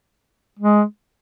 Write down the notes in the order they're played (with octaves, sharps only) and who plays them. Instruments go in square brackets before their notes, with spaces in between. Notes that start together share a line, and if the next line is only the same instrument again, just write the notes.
[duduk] G#3